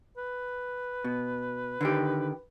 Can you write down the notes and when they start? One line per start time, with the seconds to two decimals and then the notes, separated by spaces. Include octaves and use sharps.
0.17 B4
1.04 B2
1.81 D3 D#3 G4